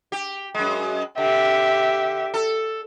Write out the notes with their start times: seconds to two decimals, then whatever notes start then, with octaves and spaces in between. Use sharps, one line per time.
0.12 G4
0.55 F#2 G#3
1.18 D3 G4 E5
2.34 A4